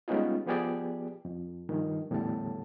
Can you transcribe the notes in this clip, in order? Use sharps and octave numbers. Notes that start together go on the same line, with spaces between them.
G3 G#3 B3 C#4 D#4 F4
F3 B3 G4 G#4 D5
F2
G2 D#3 F3
E2 A2 D3 G3 A5